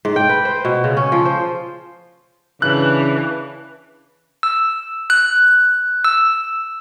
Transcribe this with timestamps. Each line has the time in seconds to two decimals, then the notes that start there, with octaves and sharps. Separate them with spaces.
0.05 G#2
0.16 G5
0.29 B4
0.45 C5
0.65 B2
0.84 C#3
0.97 C#4
1.12 F3
1.25 C5
2.62 C#3 E3 D4 F#6
4.43 E6
5.10 F#6
6.05 E6